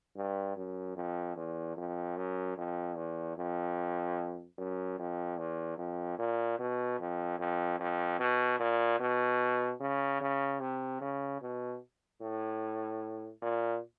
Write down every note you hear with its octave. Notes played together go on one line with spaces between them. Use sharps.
G2
F#2
F2
E2
F2
F#2
F2
E2
F2
F#2
F2
E2
F2
A#2
B2
F2
F2
F2
B2
A#2
B2
C#3
C#3
C3
C#3
B2
A2
A#2